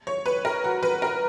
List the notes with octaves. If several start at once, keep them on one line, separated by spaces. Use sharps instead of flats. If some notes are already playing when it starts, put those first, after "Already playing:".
C#5
B4
A#4
F#4
B4
A#4